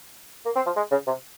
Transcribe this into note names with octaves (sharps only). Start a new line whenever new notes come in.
A#3
C4
F3
G#3
C#3
C3